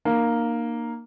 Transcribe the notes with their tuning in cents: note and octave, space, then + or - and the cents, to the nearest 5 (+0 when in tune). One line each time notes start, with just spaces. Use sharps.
A#3 +0 D#4 -45